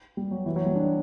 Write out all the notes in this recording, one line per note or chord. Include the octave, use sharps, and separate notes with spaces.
G3
F#3
E3
F#3
G3
D4